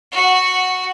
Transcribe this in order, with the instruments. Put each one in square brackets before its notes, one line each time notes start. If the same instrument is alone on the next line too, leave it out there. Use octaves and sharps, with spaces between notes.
[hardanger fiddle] F#4 F#5